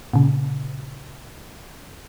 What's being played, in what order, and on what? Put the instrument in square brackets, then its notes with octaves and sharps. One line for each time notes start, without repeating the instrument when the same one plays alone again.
[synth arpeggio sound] A#2 C#3